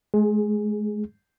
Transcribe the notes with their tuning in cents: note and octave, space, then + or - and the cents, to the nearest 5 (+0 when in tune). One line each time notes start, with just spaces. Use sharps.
G#3 +35 G#4 +0